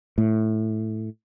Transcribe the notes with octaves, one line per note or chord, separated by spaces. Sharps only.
A2